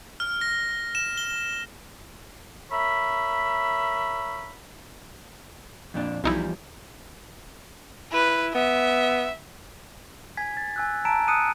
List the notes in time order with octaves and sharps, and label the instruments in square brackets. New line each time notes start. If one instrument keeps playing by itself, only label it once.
[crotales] F6
A#6
E7
G7
[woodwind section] A#4 C#5 E5 B5
[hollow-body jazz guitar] F2 A#2 D4
[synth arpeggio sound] B1 D#4 E4 [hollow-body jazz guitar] E2 F3 G3
[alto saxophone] E4 [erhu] B4
[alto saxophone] B3 [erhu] E5
[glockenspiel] G#5 G#6 B6
A6
G#5 E6 F#6
A5 A#5 E6 B6 D7 E7
D#6 F#6 C#7 D#7